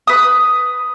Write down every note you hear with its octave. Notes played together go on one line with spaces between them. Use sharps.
B4 D#6